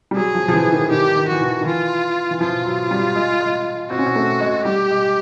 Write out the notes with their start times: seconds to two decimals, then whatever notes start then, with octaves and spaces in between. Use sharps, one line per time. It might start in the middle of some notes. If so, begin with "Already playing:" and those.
0.11 G3
0.16 F#3 G#4
0.35 F3
0.48 F3
0.54 E3
0.72 D#3
0.91 D#3 G4
1.16 D#3
1.28 E3 F#4
1.41 D#3
1.61 D#3
1.66 E3 F4
2.31 E3
2.41 F3 F4
2.66 F#3
2.91 G3
3.15 G#3
3.41 G#3
3.90 C4 F#4
3.98 C#4
4.06 C4
4.15 A3
4.40 G#3
4.65 G3 G4
4.90 G#3